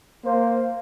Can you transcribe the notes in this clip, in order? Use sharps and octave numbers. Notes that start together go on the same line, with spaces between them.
A#3 C5